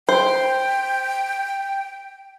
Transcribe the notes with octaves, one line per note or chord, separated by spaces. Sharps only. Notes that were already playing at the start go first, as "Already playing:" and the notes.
C5 G5